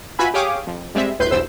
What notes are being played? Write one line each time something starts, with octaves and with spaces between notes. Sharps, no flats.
F4 F#4 B4 E5 G#5 B5
G4 G#4 C#5 F5 D6 D#6
F2
G3 G#3 C4 E5
G1 D2 A2 B4 C6 G6
B1 E2 G2 C5 E6